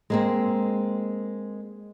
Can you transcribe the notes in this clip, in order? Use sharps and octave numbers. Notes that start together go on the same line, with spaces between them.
G#3 A#3 C4